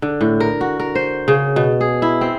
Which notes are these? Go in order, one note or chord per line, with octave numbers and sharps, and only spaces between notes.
D3
A2
A#4
F#4
A#4
C5
C#3
B2
G#4
E4
C4